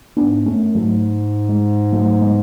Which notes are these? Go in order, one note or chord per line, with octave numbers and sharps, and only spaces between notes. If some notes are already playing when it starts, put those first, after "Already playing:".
G#2 B3 D4
F#2 A3 C#4
G#2 F#3 A3
G#3
F#3 A3
G#3 B3